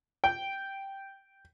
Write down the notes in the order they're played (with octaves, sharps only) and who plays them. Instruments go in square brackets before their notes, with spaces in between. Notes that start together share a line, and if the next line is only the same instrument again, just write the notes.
[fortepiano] G5